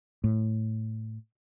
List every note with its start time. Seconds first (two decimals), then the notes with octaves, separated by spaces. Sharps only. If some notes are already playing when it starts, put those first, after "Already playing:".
0.24 A2